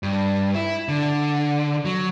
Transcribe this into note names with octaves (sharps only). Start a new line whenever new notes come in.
G2
E4
D3
F#3